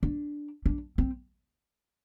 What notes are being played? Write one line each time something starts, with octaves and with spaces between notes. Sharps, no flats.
D4
D4
C4